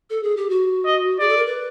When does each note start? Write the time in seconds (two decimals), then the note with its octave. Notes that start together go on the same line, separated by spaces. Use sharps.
0.10 A4
0.23 G#4
0.37 G4
0.50 F#4
0.85 D#5
1.20 G#4 D5
1.29 A4
1.37 A#4
1.46 B4